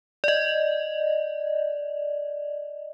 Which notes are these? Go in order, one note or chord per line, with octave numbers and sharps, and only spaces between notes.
D5 D#5